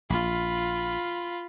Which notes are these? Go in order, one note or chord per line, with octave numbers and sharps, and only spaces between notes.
A#1 F4 B5